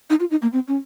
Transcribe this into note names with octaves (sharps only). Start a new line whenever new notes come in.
D#4
F4
D#4
A#3
C4
C#4